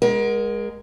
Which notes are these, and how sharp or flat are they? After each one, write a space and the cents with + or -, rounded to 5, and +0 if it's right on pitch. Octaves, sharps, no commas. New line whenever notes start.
G#3 -5 A#4 +30 F#5 +0